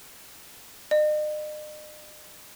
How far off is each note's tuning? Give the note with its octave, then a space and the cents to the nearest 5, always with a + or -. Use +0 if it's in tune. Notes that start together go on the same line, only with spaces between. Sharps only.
D#5 -45